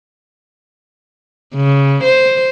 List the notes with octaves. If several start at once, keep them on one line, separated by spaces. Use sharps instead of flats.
C#3
C5